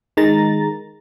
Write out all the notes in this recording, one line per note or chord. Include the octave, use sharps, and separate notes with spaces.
D#3 G#3 A#5 A6